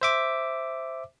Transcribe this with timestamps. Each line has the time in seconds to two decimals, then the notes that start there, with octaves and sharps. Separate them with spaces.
0.01 C5 E5 D6